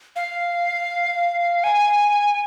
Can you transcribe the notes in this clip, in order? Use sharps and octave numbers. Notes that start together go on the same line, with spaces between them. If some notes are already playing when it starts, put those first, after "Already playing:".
F5
G#5